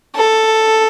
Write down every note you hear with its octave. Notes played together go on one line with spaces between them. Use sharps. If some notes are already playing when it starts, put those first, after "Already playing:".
A4